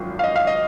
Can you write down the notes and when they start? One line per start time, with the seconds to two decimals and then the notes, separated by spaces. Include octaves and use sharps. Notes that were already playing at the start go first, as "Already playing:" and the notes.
Already playing: G#1 F#2 F3
0.19 F5
0.24 D#5
0.36 F5
0.47 D#5